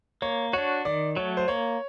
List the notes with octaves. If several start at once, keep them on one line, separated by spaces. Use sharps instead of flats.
A#3 C#5
D4 F#4 C#5
D#3 D5
F#3 A3 C#5
C5
A#3 C#5